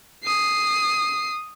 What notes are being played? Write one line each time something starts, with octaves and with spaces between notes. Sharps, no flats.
D#6 C7